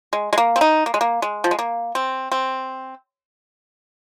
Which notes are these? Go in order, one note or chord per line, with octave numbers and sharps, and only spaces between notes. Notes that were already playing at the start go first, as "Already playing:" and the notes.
G#3
G#3
A#3
C4
D#4
A#3
G#3
A#3
G#3
F3
G#3
A#3
C4
C4